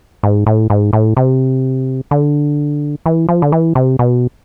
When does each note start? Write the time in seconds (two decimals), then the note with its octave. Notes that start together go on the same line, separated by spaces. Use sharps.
0.23 G#2
0.46 A2
0.70 G#2
0.93 A2
1.17 C3
2.11 D3
3.06 E3
3.29 F3
3.42 D3
3.52 E3
3.75 C3
3.99 B2